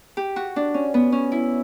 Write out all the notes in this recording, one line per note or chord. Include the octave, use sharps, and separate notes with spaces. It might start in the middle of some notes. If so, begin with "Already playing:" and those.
G4
F#4
D4
C#4
B3
C#4
E4